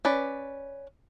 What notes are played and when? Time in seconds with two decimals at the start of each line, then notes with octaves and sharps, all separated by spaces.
0.05 C#4 B4 D5